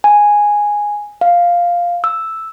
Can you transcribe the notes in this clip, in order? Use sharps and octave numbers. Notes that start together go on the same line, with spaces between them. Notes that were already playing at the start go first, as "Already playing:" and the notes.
G#5
F5
E6